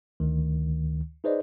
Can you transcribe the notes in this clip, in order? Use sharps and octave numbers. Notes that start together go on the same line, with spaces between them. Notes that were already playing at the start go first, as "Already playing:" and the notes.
D2 D#3
D#4 G#4 B4 C5 D5 D#5